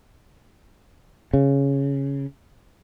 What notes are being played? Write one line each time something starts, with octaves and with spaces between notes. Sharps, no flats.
C#3